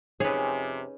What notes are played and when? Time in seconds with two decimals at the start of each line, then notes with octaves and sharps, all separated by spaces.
0.20 F2 C3 C#4 D#4 G#4 B4 C#5